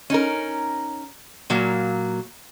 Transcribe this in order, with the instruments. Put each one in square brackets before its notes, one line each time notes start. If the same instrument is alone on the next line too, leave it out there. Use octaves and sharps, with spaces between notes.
[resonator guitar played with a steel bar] C#4 D#4 A#4
A#2 F#3 A#3